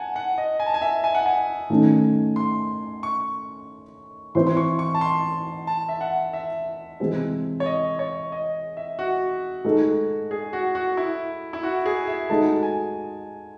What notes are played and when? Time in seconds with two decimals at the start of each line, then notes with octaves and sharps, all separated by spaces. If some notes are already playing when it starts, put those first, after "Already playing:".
Already playing: F#5 G#5 A5
0.16 F#5
0.38 D#5
0.60 G#5
0.66 A5
0.74 G#5
0.82 E5
1.04 G#5
1.15 F#5
1.26 G#5
1.70 D#3 A3 C#4
2.36 C6
3.03 C#6
4.35 E3 C4 E4 C5 C6
4.47 C6
4.57 C#6
4.79 C#6
4.94 A5
5.01 C6
5.67 A5
5.89 E5
6.01 F#5
6.33 E5
7.00 C3 E3 G#3 C4
7.60 C#5
7.66 D#5
7.99 C#5
8.32 D#5
8.77 E5
8.99 F#4
9.65 G#3 D#4 A4
10.31 G#4
10.53 F#4
10.75 F#4
10.97 E4
11.53 E4
11.63 F#4
11.86 G#4
12.07 E5
12.30 G#3 D#4 F#4 A4 A5
12.63 G#5